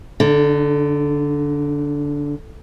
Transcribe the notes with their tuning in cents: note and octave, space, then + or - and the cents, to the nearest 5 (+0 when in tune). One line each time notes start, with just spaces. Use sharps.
D3 -15 D4 +45